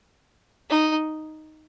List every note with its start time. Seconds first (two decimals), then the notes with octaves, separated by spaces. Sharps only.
0.70 D#4